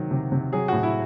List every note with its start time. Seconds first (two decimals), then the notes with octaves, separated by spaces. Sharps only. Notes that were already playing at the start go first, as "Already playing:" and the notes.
Already playing: C3 D#3 F#3
0.11 C3
0.32 C3
0.53 F#3 G#4
0.68 A2 F#4
0.83 E4